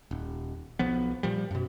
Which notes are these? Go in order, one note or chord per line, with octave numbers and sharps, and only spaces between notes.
D#1
B1 F3 B3
A#2 F3 G3
F#2 B2